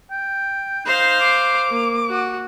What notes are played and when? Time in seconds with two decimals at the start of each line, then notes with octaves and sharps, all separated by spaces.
0.11 G5
0.86 D#4 C5 F5
1.20 D6
1.69 A#3
2.10 F#4